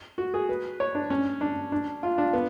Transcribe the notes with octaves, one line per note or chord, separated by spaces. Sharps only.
F#4
G#4
B4
C#5
D4
C#4
D4
D4
F4
D4
B3